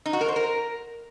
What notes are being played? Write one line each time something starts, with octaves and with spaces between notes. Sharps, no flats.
D#4
F#4
A#4
C5
A#4